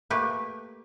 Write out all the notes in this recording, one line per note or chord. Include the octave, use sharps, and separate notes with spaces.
A3 A#3 G4 B4